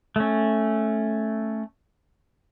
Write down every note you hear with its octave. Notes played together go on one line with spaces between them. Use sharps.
A3 C#4